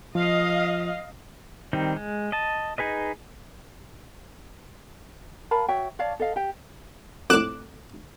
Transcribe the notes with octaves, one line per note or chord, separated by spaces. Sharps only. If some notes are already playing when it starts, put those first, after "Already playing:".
F3 D#5 F5
D#3 G3 C4 D#4
G#3
D#5 A5
D#4 G#4 B4 D#5
A#4 F5 A5 B5
F#4 C#5 E5 G5
C#5 D5 F5 A5
A4 D#5 F5
G4 G5
F2 A2 D6 F#6 E7